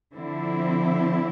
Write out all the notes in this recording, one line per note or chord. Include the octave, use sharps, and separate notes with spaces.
D3 F3 C4 E4